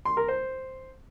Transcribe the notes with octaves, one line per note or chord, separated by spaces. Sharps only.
C6
A#4
C5